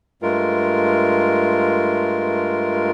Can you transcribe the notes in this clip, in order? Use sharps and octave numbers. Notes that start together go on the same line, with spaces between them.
G2 G#3 A3 F4 A#4